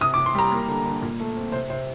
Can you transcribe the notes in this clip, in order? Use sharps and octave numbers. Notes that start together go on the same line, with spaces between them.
C3 D#6
D6
C3
C6
G3 A#5
A#3
D3
D3
A#2
A3
C4
C3 C5
C3 C5